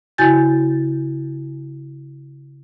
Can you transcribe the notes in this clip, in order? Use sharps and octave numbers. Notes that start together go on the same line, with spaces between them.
C#3 E4 F#4 G#5 G6 A6